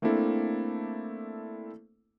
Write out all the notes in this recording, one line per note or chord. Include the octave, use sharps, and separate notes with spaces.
A3 A#3 C4 D4 E4 A4